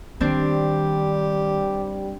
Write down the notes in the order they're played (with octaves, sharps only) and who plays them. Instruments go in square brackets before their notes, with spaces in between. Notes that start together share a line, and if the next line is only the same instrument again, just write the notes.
[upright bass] D#3 [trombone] G3 [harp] C4 D4 [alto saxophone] G4